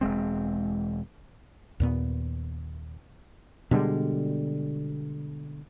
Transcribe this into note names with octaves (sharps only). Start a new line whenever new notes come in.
E1 G#3 C4
D#2 A#2 B3
B2 D3 G3 G#3